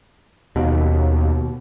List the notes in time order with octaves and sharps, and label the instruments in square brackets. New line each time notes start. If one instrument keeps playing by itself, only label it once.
[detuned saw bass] D#2 [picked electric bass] B2